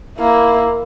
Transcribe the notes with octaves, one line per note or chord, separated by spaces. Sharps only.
A#3 E4